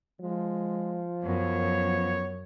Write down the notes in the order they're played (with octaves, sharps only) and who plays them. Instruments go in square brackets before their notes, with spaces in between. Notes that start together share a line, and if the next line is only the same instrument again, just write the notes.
[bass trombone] F3 [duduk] G#3
[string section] F#2 [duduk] B3 [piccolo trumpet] C#5